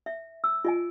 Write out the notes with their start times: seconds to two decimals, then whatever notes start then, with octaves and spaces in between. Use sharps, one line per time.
0.06 E5
0.44 E6
0.65 F4 D#5 G#5